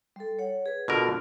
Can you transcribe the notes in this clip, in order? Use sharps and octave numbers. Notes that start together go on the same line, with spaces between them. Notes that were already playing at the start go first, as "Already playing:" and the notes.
G3 A4
C#5 F#5
G#4 B4
B2 D3 F4 A#4